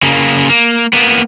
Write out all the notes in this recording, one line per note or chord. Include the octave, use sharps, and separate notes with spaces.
C#3 A#3
A#3
A#3 B3